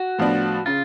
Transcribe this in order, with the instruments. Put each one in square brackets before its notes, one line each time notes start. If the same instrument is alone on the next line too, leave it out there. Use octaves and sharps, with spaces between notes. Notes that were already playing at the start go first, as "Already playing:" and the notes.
Already playing: [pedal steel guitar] F#4
[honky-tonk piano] A2 F3 B3 D4
[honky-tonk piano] C#3 [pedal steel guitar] F4